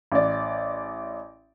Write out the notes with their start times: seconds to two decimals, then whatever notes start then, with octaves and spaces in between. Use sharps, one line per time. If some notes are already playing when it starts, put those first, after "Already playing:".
0.12 A1 D5